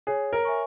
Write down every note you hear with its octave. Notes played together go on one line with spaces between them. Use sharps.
G#4 C#5
A#4
E5 G#5 C#6